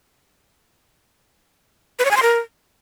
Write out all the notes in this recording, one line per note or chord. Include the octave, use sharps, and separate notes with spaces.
B4
C#5
G#5
C6
A#4